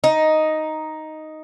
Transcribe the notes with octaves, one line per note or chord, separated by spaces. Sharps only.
D#4